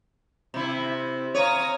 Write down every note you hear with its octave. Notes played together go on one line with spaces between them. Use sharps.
C3 E4
C#5 F5 A#5 D#6